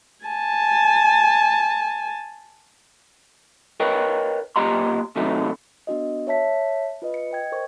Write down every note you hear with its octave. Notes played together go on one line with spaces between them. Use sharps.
G#5 A5
A#4 B4 C#5 D#5 G5
B1 A#2 G4 D#5 A#5 C6
D#2 C3 F#3 A3 D#4
B3 D4 F#4 D#5
C#5 E5 A5 B6
F4 B4 D#5
C#7
D#5 G5 G#6
A#4 C5 C#6